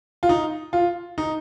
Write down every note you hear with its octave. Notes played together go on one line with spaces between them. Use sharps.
F4
D#4
F4
D#4